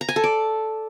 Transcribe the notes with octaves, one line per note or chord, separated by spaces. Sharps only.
A#5
G#5
A4
D5